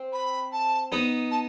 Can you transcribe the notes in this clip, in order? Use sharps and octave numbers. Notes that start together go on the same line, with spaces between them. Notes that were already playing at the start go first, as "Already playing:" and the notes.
Already playing: C4
B5
A5
B3 D#4
A5